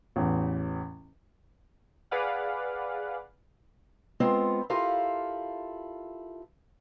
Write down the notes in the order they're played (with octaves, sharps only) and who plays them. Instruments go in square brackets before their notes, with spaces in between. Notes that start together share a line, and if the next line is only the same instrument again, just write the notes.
[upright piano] A1 E2
[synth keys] G#4 B4 D5 F5 F#5
[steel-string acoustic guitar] G#3 B3 C4 F4 A#4
E4 F4 G4 A4 A#4 F5